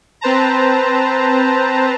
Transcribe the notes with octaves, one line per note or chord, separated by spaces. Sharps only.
C4 B4 C5 A5 A#5